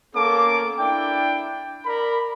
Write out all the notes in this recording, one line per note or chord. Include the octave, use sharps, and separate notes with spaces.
A#3 B3 C#4 A4 D6
D4 E4 G5
A#4 D5 B5